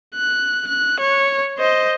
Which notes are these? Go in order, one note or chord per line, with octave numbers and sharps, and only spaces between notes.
F#6
F#6
C#5
C5 D#5